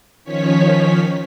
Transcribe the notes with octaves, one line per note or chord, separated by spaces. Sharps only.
D#3 F3 C#4 C#5 B6